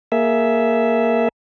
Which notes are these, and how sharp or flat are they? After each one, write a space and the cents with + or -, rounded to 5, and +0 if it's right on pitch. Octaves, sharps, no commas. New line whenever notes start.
A#3 +0 G#4 +20 E5 +0